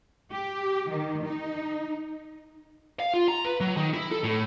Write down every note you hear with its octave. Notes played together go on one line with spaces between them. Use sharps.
G4
D#3
D#4
F5
F4
A#5
B4
F#3
D#3
E4
A4
A2